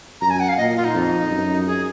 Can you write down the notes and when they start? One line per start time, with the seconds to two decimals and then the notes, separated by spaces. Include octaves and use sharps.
0.21 F#2 A#5
0.30 G#5
0.40 F#5
0.49 F5
0.58 A#2 D#5
0.76 F4
0.85 D#4
0.94 F2
1.31 F#2
1.66 G#4